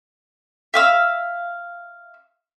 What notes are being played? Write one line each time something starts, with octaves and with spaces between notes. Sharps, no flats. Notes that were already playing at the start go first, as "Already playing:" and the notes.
E5 F5 E6